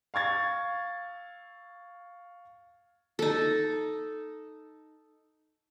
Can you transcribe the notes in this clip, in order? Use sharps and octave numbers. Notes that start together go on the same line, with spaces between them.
F5 C#6 G#6 A6
D#4 A4